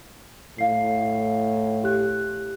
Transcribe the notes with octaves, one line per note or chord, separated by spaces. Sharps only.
A2 F5 C7
G4 F#6